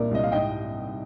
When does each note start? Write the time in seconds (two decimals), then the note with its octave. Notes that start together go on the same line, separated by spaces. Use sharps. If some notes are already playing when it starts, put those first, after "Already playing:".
Already playing: C2 A#2 A#4 D5
0.11 C2 D#5
0.24 F5
0.32 G#2 D#5 G5